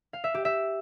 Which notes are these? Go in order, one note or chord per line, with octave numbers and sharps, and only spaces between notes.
F5
E5
G4
E5